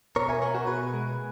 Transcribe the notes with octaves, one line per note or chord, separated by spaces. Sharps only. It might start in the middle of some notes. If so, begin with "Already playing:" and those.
B2 A#4 C#5
E5 G#5
B3 A#4 C#5
F#4 A#4
B2 G#4 B4
G#3